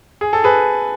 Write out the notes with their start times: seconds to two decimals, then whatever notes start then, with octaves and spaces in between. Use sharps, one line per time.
0.21 G#4
0.33 A4
0.44 G#4 B4